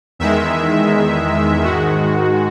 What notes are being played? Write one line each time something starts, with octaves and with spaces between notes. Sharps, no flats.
E2 D#3 G#3 E5
G#2 D#3 G#3 F#4